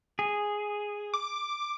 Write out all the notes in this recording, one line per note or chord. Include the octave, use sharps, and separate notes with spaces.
G#4
D6